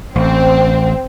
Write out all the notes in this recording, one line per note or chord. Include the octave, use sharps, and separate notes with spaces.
A1 C4